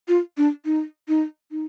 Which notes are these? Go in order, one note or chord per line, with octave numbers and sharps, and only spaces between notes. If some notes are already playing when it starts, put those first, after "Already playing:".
F4
D4
D#4
D#4
D#4